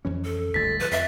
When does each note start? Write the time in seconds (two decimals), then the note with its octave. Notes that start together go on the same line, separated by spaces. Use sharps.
0.05 F2 E3 C#4
0.25 A4
0.54 G1 D2 G#2 A6 B6
0.79 F3 B4
0.91 F2 E5